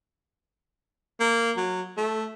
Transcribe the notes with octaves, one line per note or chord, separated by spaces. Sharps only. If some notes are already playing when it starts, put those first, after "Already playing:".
A#3
F#3
A3